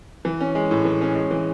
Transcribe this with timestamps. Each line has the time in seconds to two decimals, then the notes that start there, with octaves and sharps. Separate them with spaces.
0.25 E3
0.41 C#4
0.55 G#3
0.71 A2
0.85 E3
1.01 C#4
1.16 G#3
1.31 E3